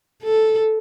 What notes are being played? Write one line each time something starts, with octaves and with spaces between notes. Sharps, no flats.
A4